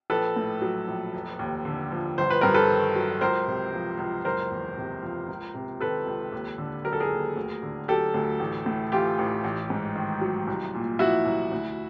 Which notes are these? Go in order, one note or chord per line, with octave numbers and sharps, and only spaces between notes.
A#1 A4 B4
A2
F#3
A#1
F1
D#2
D3
F3
G1 C5
B4
G2 A#4
A4 B4
D#3
F#3
C#2 A#4 C5
C3
F3
C#2
F#1 A#4 C5
E2
C3
F3
C#2
C3
D#3 A4 B4
C#2
D#2
D3
F#3 A#4
A4
G#4 A#4
D#2
D2
D3
F#3 G4 A4
D2
A1
A2
E3 F4 G4
A1
A1
G#2
D#3
F#3
C2
A#2
F3 E4 F#4
C2
D2